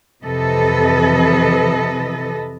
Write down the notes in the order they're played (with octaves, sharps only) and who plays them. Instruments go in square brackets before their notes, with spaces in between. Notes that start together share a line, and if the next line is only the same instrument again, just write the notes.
[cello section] F2 C3 E3 A4 B4 D#5